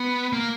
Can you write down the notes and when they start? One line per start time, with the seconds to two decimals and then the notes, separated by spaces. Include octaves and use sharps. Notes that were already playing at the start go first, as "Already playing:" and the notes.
Already playing: B3
0.33 A#3